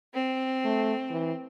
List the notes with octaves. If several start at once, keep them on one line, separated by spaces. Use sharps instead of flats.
C4
A3
E3